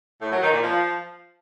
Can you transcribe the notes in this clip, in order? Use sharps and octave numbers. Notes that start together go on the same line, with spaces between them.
A2
F#3
D#3
A#2
F3